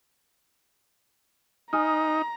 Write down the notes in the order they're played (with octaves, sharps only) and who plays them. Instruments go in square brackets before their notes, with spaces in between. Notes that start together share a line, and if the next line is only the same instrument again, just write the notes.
[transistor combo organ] D#4 [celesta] G#5 D#6 F6 [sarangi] A#5